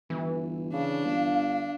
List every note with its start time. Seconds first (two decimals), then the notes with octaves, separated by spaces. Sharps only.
0.10 G1 E3
0.74 C#3 D4 F5
1.05 G1